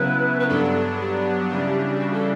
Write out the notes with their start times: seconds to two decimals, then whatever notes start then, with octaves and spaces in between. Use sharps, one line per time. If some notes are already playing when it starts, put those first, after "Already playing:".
Already playing: C#3 F#3 B3 E4 B4
0.40 B4
0.49 G2 F#3 B3 D4 A4
0.99 G4
1.49 C#3 E3 G3 D4
1.99 F#4
2.13 A4